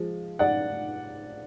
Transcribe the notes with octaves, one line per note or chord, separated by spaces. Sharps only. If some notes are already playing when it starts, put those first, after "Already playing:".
Already playing: F3 G#3
D5 F#5